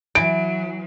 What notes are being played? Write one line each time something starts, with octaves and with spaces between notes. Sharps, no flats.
E3 F#3 D7